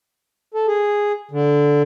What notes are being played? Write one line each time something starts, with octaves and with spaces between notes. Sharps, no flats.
A4
G#4
D3